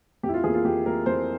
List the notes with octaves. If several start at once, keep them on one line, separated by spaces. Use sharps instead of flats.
F2 G4
E4
F4
E3 A#3 G#4
F4
F2 G4
E3 A#3 A#4
F2 C5